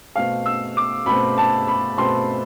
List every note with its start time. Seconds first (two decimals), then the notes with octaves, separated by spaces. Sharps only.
0.15 B2 A3 C4 F5
0.46 E6
0.77 D6
1.06 B2 A3 C4 B5
1.38 A5
1.67 B5
1.98 B2 A3 C4 C6